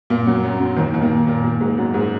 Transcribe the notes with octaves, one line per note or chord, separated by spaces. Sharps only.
A#2 A#3
F#2 F#3
F#2 F#3
F#2 F#3
D#2 D#3
D#2 D#3
A#2 A#3
A#2 A#3
A#2 A#3
G#2 G#3
F#2 F#3
G#2 G#3